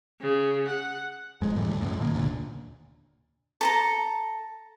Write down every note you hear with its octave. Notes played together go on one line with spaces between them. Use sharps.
C#3
F#5
E1 F2 G#3
F2 A2 E3 G3
D2
C#2 F#2 A2
A#2 D#3 A#3
F1 D2 A#2 D3
A4 A5 A#5